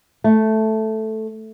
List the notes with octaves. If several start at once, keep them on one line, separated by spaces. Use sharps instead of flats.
A3